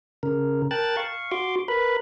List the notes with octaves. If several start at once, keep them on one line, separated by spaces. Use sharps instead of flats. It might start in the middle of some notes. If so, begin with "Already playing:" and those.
C#3 A#4
A#4 G5 A5 F#6 A6
F5 C#6
F#4 C6 D6
A#4 B4 B5